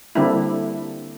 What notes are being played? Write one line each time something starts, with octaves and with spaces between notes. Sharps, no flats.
D3 G3 A#3 C4 D4 E4